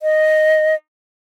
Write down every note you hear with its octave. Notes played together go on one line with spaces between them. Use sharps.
D#5